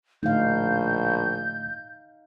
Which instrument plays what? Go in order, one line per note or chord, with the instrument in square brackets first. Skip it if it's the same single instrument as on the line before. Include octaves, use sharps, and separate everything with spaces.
[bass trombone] A#1 [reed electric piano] A2 D3 A3 [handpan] D#4 F5 [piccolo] G6